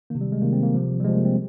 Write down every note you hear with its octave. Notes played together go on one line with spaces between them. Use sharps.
C3 D#3 A#3
G3
G#3
C3 D#3 A#3
C4
A#3
C3 F3
G3
C3 F3 G#3
A#3
C4